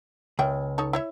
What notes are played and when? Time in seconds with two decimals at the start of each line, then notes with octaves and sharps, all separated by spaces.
0.39 C#2 A#3 E5 G5
0.78 D#4 A4 C#5
0.93 E4 C#5 E5